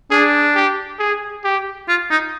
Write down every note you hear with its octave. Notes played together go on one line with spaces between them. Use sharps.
D4 G#4
G4
G#4
G4
F4
D#4